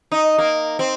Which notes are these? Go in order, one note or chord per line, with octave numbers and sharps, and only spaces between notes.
D#4
A#3
C4